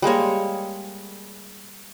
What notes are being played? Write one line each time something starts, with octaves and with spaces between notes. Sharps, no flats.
G3 G#3 A#3 C#5